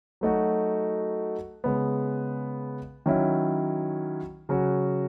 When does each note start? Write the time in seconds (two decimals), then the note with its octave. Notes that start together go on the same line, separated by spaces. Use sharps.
0.21 F#3 A3 D#4 F#4
1.64 C#3 G#3 B3
3.06 D#3 F#3 C#4 E4
4.49 C#3 F#3 C#4 F#4